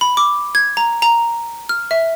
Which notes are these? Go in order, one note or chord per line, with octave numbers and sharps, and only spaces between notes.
B5
D6
G#6
A#5
A#5
F6
E5